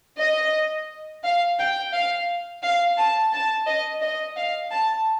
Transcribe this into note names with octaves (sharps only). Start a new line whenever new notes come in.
D#5
F5
G5
F5
F5
A5
A5
D#5
D#5
F5
A5